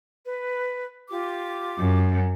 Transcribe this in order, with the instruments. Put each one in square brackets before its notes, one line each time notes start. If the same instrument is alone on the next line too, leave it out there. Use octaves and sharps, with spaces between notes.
[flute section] B4
F4 G4 D6
[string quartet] F#2